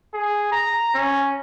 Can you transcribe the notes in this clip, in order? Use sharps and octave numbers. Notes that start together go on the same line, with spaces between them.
G#4
A#5
C#4